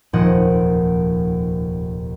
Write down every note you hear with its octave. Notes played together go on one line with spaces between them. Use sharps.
F1 D#2 A#2 F3 D#5 F#5